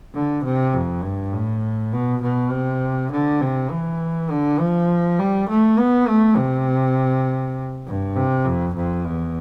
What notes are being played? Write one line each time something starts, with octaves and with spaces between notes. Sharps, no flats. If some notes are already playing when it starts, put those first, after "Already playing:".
D3
C3
F2
G2
A2
B2
B2
C3
D3
C3
E3
D3
F3
G3
A3
B3
A3
C3
G2
C3
F2
F2
E2